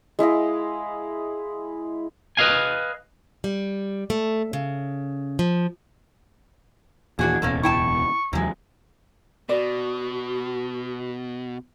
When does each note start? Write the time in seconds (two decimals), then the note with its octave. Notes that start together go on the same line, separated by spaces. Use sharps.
0.19 G#3 E4 D#5 F5
2.37 B4 D#5 F5 G#5
3.44 G3
4.10 A3
4.53 C#3
5.39 F3
7.19 D#2 A#2 E3 D4 F#4 G#4
7.42 D1 E2 B2 A#3 C#4 A4
7.63 E4 G5 A5 C#6
8.33 D#2 C3 E3 F#3 G#3
9.49 B2 F#4 D5